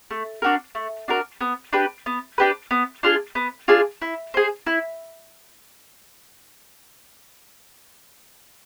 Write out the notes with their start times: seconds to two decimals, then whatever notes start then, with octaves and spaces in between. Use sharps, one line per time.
0.11 A3
0.42 D4 F#4 A#4
0.75 A3
1.08 D4 F#4 A#4
1.41 B3
1.73 D4 G4 B4
2.06 B3
2.38 D4 G4 B4
2.71 B3
3.03 D4 F4 G#4
3.35 B3
3.68 D4 F4 G#4
4.02 E4
4.34 G#4 C5
4.66 E4